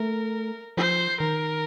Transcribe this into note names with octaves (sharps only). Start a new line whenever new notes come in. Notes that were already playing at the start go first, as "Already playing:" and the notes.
Already playing: A3 A#4
F3 C5
D#3 A#4